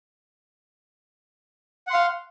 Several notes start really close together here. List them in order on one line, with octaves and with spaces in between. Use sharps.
F#5 C6 F5